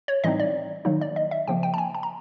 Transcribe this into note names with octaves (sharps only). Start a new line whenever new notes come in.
C#5
A2 E3 G3 C4 D#4 D#5
D5
D#3 F#3 A#3 D#4
D5
D#5
E5
C#3 F3 A#3 G5
G5
A5
G#5
A5
A#5